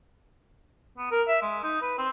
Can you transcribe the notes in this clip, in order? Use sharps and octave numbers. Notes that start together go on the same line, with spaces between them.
B3
A#4
E5
G#3
D#4
B4
C4